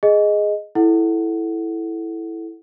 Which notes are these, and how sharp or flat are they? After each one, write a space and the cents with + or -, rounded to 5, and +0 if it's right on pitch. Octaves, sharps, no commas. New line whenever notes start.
G#4 +0 D#5 +0
E4 +0 A4 -10 F#5 +5